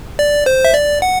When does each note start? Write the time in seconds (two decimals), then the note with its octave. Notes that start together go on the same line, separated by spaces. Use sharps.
0.19 D5
0.46 C5
0.65 E5
0.74 D5
1.02 F#5